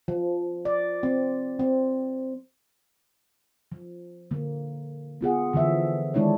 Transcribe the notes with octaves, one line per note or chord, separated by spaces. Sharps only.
F3
D5
C4
C4
F3
D3 A#3
B3 F4 G#4 F#5
D3 E3 F3 E5
D#3 G#3 D4 E4 C#5